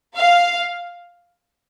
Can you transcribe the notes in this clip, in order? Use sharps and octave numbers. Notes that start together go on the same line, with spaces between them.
F5